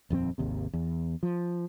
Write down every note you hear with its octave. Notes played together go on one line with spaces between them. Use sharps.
D#1 F2 F3 C4
G#1 D#2 C3
E2
F3